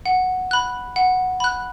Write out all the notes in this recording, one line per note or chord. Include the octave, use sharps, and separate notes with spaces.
F#5
B5 F#6
F#5
B5 F#6